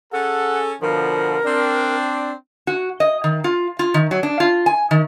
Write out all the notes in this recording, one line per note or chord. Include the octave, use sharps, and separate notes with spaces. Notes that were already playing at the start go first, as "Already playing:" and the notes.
C#4 G#4 A4 F#5
B2 D3 F3 A#4
C4 D4
F#4
D#5
D#3
F4
F4
D#3
F#3
D4
F4
G#5
D#3